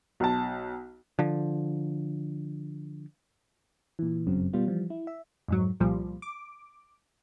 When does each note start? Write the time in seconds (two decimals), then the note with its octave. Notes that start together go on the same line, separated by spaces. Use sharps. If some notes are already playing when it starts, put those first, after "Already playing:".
0.20 B1 A5
1.19 D3 F3
3.99 A#2 E3
4.27 G1 F#2 C#3 F#3 C4
4.53 B2 G3 B3 F4
4.67 E3 F3 G3
4.90 E4
5.07 E5
5.48 F2 G#2 F#3
5.80 C2 A#2 F3 G3
6.22 D6